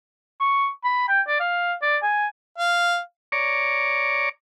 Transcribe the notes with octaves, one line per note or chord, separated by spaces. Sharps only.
C#6
B5
G5
D5
F5
D5
G#5
F5
C#5 D5 A#5 C#6 D6